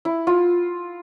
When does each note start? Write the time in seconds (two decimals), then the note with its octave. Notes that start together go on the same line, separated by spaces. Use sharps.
0.05 E4
0.27 F4